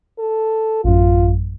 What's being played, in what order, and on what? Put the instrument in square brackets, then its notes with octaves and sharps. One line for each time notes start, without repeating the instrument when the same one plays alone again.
[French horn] A4
[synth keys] A1 F#2 [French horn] F4